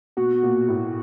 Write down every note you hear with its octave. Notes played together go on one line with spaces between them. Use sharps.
B2 F#4
A#2
A2